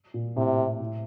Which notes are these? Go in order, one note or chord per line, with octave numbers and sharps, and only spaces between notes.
A#2
A2 C3
A2